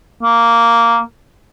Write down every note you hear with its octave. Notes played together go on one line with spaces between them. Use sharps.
A#3